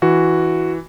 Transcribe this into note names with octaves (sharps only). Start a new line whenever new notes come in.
E3 F#4